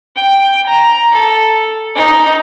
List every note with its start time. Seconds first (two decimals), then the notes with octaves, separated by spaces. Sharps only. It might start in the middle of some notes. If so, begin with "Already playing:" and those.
0.16 G5
0.66 A#5
1.12 A4
1.95 D#4